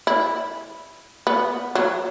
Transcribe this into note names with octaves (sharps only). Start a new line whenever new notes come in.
E4
B3
F#3